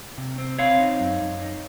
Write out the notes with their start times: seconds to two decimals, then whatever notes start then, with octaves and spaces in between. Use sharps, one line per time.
0.18 C3
0.38 C4
0.58 C4 C#5 F5
0.79 D#4
1.00 F#2
1.21 F#2
1.42 D#4